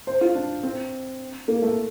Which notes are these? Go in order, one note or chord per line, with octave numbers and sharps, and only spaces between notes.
C5
F4
D4
C4
A#3
A3